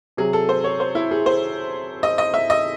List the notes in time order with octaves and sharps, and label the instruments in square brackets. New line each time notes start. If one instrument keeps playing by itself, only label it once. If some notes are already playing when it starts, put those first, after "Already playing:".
[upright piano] C3 F#3 G#4
A4
C5
C#5
C5
E4
G#4
C5
D#5
D#5
E5
D#5